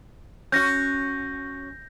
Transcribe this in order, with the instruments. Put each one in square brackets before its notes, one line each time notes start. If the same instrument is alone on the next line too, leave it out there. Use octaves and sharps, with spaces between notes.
[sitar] C#4 F#4 [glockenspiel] G6 A#6